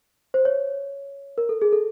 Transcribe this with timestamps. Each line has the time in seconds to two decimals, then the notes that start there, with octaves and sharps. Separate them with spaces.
0.34 C5
0.45 C#5
1.38 A#4
1.49 A4
1.62 G#4
1.72 A4